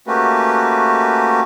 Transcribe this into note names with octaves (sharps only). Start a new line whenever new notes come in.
A3 A#3 C#4 F#4 G4 B4